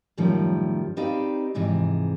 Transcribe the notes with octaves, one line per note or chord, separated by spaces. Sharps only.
F#2 A2 D#3 F3 G3
C4 D#4 G4 B4 D5 F5
F2 G#2 C3 E3 G#4